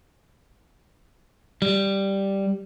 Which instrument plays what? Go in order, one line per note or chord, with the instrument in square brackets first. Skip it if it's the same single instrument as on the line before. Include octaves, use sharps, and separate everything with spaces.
[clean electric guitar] G3